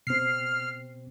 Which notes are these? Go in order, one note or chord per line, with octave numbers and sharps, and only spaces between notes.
B2 C4 F6 C7